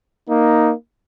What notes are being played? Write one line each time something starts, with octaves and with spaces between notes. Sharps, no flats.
A#3 D#4